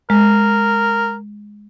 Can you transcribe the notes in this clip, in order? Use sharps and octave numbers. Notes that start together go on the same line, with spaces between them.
G#3 A#4